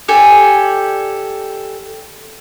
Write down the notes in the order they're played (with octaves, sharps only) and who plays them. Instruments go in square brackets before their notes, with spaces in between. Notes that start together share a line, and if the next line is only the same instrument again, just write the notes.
[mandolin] G4 A4 D5 G#5